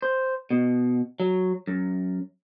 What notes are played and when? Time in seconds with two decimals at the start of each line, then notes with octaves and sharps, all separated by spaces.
0.02 C5
0.50 B2
1.20 F#3
1.67 F#2